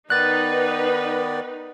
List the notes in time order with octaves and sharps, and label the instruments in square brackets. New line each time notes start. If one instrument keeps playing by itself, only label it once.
[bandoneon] D#3 B3 D5 [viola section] D#4 B4 [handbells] F#6 A6